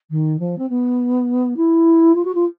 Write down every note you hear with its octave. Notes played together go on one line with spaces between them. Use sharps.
D#3
F3
C4
B3
E4
F4
F#4
F4